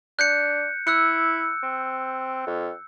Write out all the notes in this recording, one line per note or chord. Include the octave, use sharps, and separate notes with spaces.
D4 F#6 G6 C#7
E4 E6 F#6 C#7
C4
F2